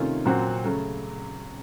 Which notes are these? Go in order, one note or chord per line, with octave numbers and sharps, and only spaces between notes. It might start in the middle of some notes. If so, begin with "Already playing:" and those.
Already playing: C3 D#3 A3 C#4 F4
A#2 F#3 C4 F#4
C#3 F#3 A3